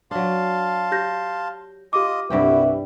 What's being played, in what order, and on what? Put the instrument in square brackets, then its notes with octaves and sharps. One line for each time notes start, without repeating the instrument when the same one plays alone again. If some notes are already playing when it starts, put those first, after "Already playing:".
[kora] F#3 D4 [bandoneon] F5 A5 C6
[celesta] G4 G6 A#6
[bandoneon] F4 D#5 D#6 [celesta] G4 D6
[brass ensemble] C2 B4 E5 [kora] G2 G3 G5 [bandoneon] E4 F#4